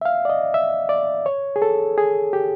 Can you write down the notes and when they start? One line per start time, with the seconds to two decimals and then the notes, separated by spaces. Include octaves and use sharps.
0.01 E5
0.05 F5
0.25 D5
0.30 D#5
0.54 E5
0.89 D5
1.26 C#5
1.56 G#4
1.62 A4
1.98 G#4
2.33 G4